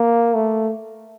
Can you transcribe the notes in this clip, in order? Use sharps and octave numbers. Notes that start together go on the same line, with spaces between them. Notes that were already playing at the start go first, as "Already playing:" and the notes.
Already playing: A#3
A3